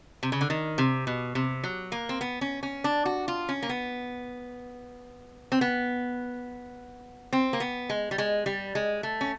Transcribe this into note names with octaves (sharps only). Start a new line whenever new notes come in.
C3
C#3
D3
D#3
C3
B2
C3
F#3
A#3
C4
B3
C#4
C#4
D4
F#4
F4
C#4
A#3
B3
C4
B3
C4
A#3
B3
G#3
G3
G#3
G3
G#3
A3
C#4